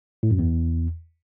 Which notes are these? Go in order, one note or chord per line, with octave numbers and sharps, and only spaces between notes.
A2
F#2
E2